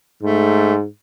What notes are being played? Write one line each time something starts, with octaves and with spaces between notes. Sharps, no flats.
G#2 A3